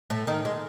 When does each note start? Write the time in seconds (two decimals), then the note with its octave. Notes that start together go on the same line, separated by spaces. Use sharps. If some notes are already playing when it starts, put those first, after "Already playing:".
0.10 A2 A3
0.27 D#3 D#4
0.45 G#3